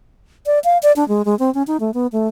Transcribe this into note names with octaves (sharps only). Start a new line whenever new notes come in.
D5
F5
D5
D4
G#3
G#3
C4
C#4
D#4
A3
B3
A3